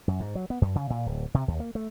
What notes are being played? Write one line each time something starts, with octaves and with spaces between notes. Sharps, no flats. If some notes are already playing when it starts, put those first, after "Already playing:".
F#2
G#2
F#3
B3
F#2
C#3
A#2
D1
C3
D#2
A#3
A3